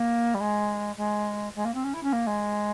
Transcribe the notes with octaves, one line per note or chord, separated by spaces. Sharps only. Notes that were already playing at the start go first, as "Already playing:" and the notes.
Already playing: A#3
G3
G#3
G#3
G#3
A#3
C4
C#4
E4
C#4
A#3
G#3